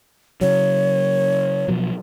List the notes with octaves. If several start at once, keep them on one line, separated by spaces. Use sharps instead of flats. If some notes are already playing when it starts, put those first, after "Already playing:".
C#3 F#3 C#5
B2 F3 F#3